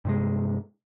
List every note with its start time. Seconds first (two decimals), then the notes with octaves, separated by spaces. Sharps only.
0.05 G2 C3 G#3